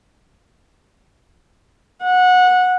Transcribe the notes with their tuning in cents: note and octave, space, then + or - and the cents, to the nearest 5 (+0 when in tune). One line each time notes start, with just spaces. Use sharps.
F#5 -20